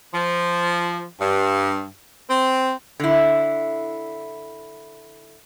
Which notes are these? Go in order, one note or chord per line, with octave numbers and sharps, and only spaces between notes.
F3
G2
C4
D3 E4